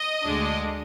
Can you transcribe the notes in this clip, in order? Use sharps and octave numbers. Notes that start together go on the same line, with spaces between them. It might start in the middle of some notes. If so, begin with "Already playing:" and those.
Already playing: D#5
D2 D3 G#3 D4